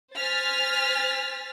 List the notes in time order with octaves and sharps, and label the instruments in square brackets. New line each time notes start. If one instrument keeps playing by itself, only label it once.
[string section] C5 G#5 F6 A6 B6